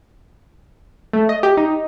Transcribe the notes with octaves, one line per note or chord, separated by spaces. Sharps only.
A3
D#5
G4
D#4